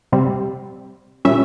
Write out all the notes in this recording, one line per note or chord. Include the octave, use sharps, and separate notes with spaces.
C3 G3 C4
A#2 G3 C#4 E5